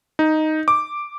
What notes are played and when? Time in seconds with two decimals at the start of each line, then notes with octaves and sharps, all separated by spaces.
0.19 D#4
0.68 D6